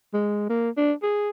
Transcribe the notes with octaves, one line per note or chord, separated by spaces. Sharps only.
G#3
A#3
D4
G#4